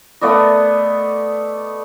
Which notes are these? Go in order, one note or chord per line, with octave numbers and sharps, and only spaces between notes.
A3 B3 D5 D#5